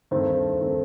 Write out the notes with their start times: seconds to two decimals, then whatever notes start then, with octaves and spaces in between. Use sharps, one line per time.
0.11 G2 D#3 A3 C4 C5
0.61 D#3 A3 C4